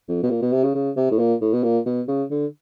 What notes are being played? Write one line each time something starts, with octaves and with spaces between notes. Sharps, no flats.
F2
B2
A#2
B2
C3
C#3
C#3
C3
A2
A#2
A2
B2
A#2
B2
C#3
D3